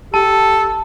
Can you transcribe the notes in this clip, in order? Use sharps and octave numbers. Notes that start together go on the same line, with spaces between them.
G4 A4 A5